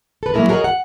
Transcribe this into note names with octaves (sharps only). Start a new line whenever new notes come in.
A4 B4
F#3 G#3 A#3 E4 G#4 A#4
F#4 G#4 A#4 C5 C#5 D#5
F#5